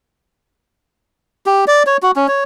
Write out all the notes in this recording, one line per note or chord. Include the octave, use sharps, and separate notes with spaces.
G4
D5
C#5
F#4
C#4
C#5